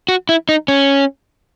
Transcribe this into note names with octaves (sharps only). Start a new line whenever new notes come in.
F#4
E4
D#4
C#4